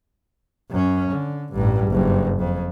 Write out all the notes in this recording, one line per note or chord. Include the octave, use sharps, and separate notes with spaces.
F#2 C#4
D3
A1 G2
F#1 G2
F2